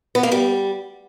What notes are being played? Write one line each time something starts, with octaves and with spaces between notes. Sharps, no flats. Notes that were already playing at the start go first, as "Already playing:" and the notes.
B3
A#3
G3